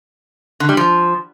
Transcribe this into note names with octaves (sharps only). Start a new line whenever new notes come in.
D3
G3
F3